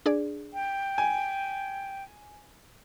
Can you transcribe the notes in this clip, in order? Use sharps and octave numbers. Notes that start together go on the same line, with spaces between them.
D4 G#4 D5
G5
G#5